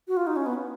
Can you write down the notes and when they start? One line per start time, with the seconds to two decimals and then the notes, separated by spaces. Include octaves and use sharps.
0.08 F#4
0.17 F4
0.27 D#4
0.36 C#4
0.46 B3